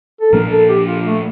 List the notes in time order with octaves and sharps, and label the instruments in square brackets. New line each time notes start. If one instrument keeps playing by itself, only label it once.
[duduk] A4
[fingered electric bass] A#2 F3 A#3 D4 [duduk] A#4
[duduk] A4
G4
F4
A3